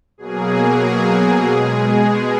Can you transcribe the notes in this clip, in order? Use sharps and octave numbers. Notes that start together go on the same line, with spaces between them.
B2 F#3 A#3 G#4
B2 F#3 A#3
B2 G#3